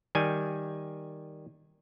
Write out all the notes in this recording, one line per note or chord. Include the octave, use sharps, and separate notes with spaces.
D#3 G3 G#5